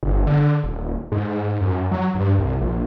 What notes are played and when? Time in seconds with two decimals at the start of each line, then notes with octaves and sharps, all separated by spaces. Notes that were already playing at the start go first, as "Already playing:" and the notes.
0.03 G1
0.27 D3
0.64 D#1
1.12 G#2
1.61 F#2
1.92 F#3
2.15 G2
2.39 C2
2.61 A#1